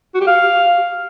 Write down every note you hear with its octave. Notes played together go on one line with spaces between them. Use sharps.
F#4
G4
F5